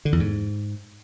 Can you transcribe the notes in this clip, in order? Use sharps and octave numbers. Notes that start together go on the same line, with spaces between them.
D3
E2
G#2